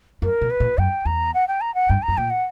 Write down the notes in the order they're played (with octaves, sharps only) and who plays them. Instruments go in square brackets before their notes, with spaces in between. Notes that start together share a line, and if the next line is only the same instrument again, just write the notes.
[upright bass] F#2 [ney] A#4
[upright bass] B2
[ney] B4
[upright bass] A#2
[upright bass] F#2 [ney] G5
[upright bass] E2 [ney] A#5
[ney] F#5
G5
A#5
F#5
[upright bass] G2 [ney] G5
[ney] A#5
[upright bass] F#2
[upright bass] A#2 [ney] G5
[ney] F#5